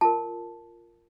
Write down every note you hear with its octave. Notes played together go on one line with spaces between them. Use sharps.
F4 A#4 A5